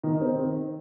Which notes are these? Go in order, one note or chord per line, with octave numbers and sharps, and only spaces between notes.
D#3
C4